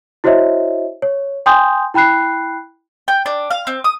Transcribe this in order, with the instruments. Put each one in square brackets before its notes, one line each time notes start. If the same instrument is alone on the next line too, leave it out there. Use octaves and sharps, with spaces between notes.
[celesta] E4 F#4 C5 C#5 D#5 E5
C#5
G5 G#5 C6 D#6 G6
E4 G5 B5 F#6 C7
[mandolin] G5
D4
F5
C4
D#6